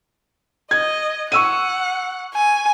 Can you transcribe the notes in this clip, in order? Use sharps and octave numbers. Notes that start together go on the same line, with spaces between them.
D#5 G#6
F#5 C#6 E6 D#7
G#5